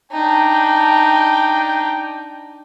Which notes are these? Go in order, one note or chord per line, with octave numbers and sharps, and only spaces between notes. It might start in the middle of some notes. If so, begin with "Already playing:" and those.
D4 D#4 G5